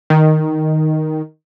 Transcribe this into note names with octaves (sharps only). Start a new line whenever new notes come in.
D#3